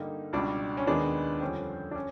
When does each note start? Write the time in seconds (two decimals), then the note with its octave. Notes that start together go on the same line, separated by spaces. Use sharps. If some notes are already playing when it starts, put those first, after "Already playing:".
Already playing: G2 D3 G3 A#3 D#4
0.33 C#2 B2 G3 D4
0.77 C#4
0.87 D#2 D#3 G#3 B3 D4
1.41 F2 D3 G3 C4 C#4
1.91 D4
1.95 C#4